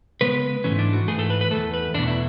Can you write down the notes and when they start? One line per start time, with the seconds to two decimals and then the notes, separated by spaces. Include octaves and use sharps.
0.21 C#3 G#3 B3 B4
0.64 G#2 E3 A3 C#4
0.79 D4
0.93 F#4
1.08 G#2 E3 A3 G#4
1.19 A4
1.30 B4
1.41 B4
1.51 E2 B2 A3 A4
1.74 B4
1.94 E2 B2 A3 D4
2.08 E4